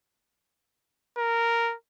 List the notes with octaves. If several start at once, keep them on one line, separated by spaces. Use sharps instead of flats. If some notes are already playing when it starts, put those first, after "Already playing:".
A#4